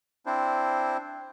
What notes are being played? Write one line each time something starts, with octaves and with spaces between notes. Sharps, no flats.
C4 D4 E4 C5